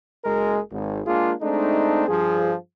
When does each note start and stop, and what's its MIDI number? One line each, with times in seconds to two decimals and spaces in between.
0.25 0.59 30
0.25 0.59 56
0.25 0.59 70
0.71 1.01 32
1.06 1.32 56
1.06 1.32 58
1.06 1.32 62
1.06 1.32 65
1.06 1.32 68
1.41 2.07 56
1.41 2.07 57
1.41 2.07 60
1.41 2.07 62
1.41 2.07 63
2.08 2.53 43
2.08 2.53 53
2.08 2.53 68